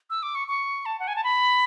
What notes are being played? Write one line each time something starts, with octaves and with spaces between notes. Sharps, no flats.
E6
D6
C#6
C#6
A5
F#5
G#5
A5
B5